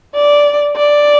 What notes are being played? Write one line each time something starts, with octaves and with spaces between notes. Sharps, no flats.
D5
D5